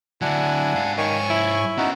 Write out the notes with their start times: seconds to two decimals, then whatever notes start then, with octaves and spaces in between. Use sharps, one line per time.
0.22 D3 F#3 D4 E4 F#5 G#5
0.76 G#2 F5
0.98 D#3 C#5 G#5 C#6
1.30 E4
1.78 B3 C#4 D#4 F#4